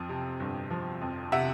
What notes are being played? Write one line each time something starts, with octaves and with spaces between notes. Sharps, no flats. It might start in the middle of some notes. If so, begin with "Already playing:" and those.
Already playing: F2 F3
C3
G1
F3
F2
C3 E5 F#5